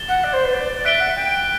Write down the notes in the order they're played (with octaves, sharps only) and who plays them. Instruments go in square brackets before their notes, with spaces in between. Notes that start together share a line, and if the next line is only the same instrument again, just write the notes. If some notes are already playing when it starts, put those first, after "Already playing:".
Already playing: [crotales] A6 E7 G7
[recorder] F#5
D5
C5
B4
D5
D5
[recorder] E5 [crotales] F#6 B6 D7 G7
[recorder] F#5
G5